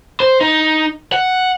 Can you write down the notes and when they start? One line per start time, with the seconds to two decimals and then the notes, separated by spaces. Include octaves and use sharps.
0.20 C5
0.41 D#4
1.13 F#5